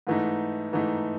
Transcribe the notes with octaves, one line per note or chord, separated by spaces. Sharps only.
G#2 E3 A3 D#4
G#2 E3 A3 D#4